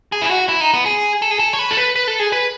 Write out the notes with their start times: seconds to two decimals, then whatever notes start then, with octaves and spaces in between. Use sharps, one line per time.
0.12 G#4
0.22 E4
0.30 F#4
0.49 E4
0.61 D#4
0.74 B3
0.86 G#4
1.22 A4
1.31 G#4
1.39 A4
1.53 C#5
1.59 B4
1.70 A4
1.77 B4
1.96 B4
2.07 A4
2.19 G#4
2.32 B4